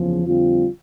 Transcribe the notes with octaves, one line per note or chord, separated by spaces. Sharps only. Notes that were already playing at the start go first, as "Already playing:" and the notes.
Already playing: F#1 E2 C#3 F3
F2 D3 G3 C4 F4